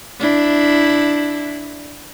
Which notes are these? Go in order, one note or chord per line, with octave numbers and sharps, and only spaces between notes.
D4 E4